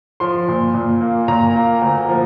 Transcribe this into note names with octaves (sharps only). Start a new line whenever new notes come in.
F3 C6
A#2
A#2
A#3
A#2 A#5
A#3
D2
F3